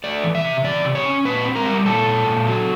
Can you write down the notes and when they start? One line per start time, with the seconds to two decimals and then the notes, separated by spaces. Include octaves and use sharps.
0.04 A3 D5
0.24 E3
0.35 E5
0.45 C3
0.64 E3 D5
0.85 C3
0.95 C#5
1.06 C#4
1.25 A#2 B4
1.45 C4
1.55 A#4
1.66 G3
1.86 A#2 A4
2.06 A#2
2.26 A#2
2.47 F#3